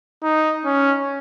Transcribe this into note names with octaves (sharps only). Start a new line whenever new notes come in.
D#4
C#4